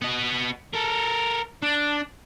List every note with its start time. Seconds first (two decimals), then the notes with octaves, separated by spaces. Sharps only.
0.02 B3 D#5
0.74 A4 A#4
1.62 D4